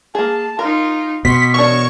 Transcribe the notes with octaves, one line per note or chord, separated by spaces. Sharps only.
A#3 G#4 A5
D#4 F4 A#4
B2 C6 C#6 B6
E3 D4 A#4 C#5 C#6